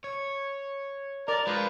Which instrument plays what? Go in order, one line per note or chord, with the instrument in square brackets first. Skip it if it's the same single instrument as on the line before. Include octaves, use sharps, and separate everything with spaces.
[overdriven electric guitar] C#5
[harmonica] A#4 [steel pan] D5
[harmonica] F3 B4 [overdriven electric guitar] G#3